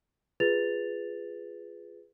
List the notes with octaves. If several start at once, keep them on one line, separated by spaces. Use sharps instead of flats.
F4 G#4 B4 A6 F7